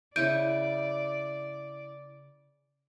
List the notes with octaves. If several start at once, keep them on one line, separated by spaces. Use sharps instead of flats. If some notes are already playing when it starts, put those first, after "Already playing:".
C#3 E4 D5 C#6 G6 D7 D#7